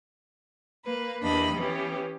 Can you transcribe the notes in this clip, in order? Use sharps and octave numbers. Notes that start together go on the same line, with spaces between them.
A#3 B4
E2 A#3 D4 G4 D#5 B5
E3 B3 C#4 G4